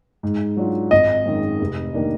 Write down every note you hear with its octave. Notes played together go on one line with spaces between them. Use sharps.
G#2
F#3 D4 F4
G#1 D#5
F#2 D#3 G#3
F1
D#3 A#3 D4